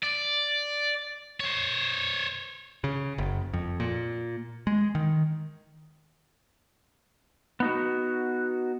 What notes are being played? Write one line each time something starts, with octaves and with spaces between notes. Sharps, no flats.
D5
C5 C#5
C#3
F#1
F2
A#2
G#3
D#3
B3 D#4 F#4